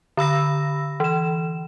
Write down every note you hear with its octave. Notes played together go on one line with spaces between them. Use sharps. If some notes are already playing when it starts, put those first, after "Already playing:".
D3 B5 E6 A#6
E3 E7